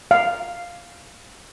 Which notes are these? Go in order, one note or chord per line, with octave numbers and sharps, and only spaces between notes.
F5